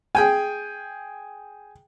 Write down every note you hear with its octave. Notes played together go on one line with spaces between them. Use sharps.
G#4 G5 G#5